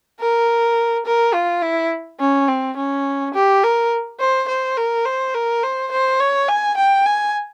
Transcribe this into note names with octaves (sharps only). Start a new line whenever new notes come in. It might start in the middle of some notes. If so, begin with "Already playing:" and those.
A#4
A#4
F4
E4
C#4
C4
C#4
G4
A#4
C5
C5
A#4
C5
A#4
C5
C5
C#5
G#5
G5
G#5